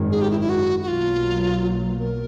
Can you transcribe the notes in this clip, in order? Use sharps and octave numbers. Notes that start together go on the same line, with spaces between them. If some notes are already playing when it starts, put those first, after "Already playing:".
Already playing: G#1 F#2 D#3 G#3
G#4
G4
E4
E4
F#4
F#4
B1 B2 F#3 A#3 F4
A#4